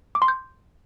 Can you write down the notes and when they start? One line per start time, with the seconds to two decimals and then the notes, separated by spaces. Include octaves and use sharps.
0.15 D6
0.22 C6
0.28 G6